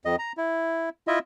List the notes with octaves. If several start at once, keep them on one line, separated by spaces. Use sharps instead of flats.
F2 D#5
A#5
E4
E4 F4 D#5 E5